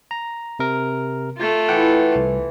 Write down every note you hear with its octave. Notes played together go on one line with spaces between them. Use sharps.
A#5
C3 A#4
A3 F4
E3 F#5 G5
C2